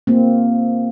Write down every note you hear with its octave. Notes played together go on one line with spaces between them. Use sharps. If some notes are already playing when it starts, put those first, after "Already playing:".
A#3 C4